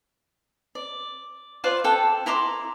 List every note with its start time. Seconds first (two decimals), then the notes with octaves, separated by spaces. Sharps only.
0.75 D5
1.64 F4 B4 C5 D5
1.84 A4 G5
2.26 E4 A#5 C6 D6